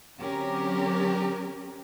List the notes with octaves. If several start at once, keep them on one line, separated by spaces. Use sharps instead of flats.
D3 F#3 C4 C#4 G4 A#4